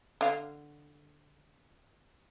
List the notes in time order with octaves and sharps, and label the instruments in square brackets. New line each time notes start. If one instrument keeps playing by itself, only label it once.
[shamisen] D3 F5